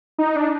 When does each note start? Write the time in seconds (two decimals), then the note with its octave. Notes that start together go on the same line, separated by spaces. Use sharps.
0.18 D#4
0.36 D4